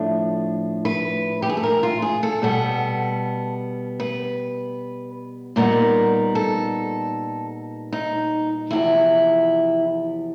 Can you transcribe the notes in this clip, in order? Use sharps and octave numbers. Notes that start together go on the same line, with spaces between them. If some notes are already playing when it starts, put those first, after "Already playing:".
Already playing: A2 F3 A3 D4
B4
G4
G#4
A4
A#4
F4
G#4
A4
B2 G3 B3 A4
B4
A#2 G3 B3 D#4 A#4
A4
D#4
E2 C3 F3 E4